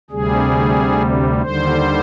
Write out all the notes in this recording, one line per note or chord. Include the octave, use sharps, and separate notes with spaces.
D2 C3 G3 G#4
D#2 D3 G3 C5